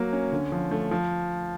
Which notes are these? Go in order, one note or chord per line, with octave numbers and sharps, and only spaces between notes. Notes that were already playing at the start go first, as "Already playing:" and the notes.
Already playing: F#3 A#3
C#4
D3
F3
A3
F3